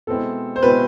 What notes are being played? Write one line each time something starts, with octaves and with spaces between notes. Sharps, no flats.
B2 G#3 C4 E4 A4
C5
B2 G#3 C4 E4 B4